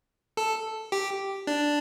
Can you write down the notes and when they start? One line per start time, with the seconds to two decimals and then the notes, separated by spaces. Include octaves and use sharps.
0.37 A4
0.92 G4
1.47 D4